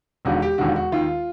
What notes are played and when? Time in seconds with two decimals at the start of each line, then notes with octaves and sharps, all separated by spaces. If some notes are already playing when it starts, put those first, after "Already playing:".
0.25 E1 D#2 D3 F#4
0.42 G4
0.58 E1 D#2 D3 F#4
0.76 F#4
0.92 D#2 D#3 F4